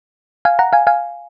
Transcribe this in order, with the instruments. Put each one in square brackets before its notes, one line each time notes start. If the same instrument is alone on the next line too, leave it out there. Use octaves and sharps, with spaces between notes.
[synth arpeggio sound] F5 G#5
F#5 A#5
F5 G#5
F5 G#5